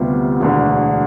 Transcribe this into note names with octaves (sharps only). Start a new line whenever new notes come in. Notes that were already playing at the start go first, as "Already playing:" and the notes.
Already playing: D2 C3 G3 B3 F4
E1 D2 D3